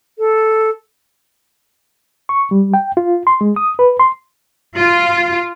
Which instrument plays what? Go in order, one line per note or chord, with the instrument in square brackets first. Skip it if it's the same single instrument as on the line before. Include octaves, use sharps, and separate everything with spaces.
[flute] A4
[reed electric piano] C#6
G3
G5
F4
C6
G#3
D#6
B4
C6
[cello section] F4